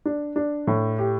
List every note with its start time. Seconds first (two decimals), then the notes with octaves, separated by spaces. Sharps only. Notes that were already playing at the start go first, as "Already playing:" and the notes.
0.06 D4
0.36 D4
0.67 A2
0.98 G4